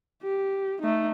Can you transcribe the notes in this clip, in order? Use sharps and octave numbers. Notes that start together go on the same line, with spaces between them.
G4
A3 D#4